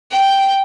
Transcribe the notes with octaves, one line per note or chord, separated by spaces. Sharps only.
G5